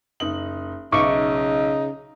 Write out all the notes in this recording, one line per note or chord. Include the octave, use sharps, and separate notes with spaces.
F#1 D#4 F#7
B1 C#3 D#4 E5 C#6 D6